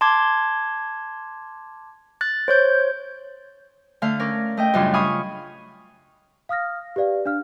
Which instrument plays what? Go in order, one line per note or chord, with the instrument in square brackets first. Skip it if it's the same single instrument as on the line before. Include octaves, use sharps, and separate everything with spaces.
[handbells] A5 C6 D6 G#6
F#6 A6
C5 C#5 G6
[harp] D3 A3 F5
C#4 A#4 D5
A3 D#5 G5
F#2 A2 C#3 G3 D4 F4
F5 G#5 B5 C#6 D#6
[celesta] F5 D#6 F6 A#6
G4 B4 D5 F5
D4 F5 F6